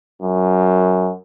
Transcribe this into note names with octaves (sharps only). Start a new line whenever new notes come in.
F#2